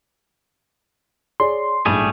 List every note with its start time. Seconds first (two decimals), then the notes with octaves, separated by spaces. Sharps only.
1.40 G#4 C#5 D5 C6
1.86 A#1 G#2 G3 A3 G#4 B5